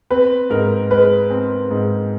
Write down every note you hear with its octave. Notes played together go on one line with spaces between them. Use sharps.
C4 B4
G#2 A#4
G#3 B4
C4
G#2